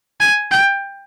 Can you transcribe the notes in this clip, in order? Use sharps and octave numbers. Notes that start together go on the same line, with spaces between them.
G#5
G5